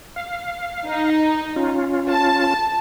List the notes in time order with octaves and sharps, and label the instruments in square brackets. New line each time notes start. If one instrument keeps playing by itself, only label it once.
[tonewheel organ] F5
[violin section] D#4
[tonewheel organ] C#4 F4
[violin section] A5